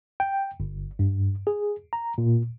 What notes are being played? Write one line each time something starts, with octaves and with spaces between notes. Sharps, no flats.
G5
G1
G2
G#4
A#5
A#2